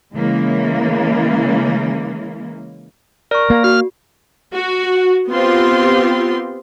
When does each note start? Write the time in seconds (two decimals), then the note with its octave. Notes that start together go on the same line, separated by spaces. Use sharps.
0.13 C#3 E3 G#3 A#3
3.31 A#4 D5 C#6
3.50 A#3
3.64 F#4 F6
4.53 F#4
5.30 B3 C4 F4 G4 C6